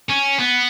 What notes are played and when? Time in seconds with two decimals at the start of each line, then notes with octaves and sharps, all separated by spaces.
0.09 C#4
0.39 B3